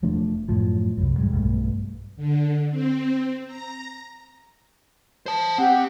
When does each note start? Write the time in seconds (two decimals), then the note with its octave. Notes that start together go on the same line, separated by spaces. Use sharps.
0.02 E1 F3 A3 D4
0.48 F#2 A2 F3
0.97 C2 F#2
1.18 E2 G#2 G3 G#3
1.33 B1 G2 A3
2.17 D3
2.70 C4
3.47 A#5
5.26 C5 A5
5.58 C4 G4 F#5